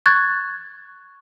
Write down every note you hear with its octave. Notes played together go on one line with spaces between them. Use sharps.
C#6 F#6 G#6 A6